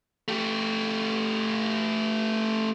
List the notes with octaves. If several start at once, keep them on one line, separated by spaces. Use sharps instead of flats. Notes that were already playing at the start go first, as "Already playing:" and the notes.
A3 G4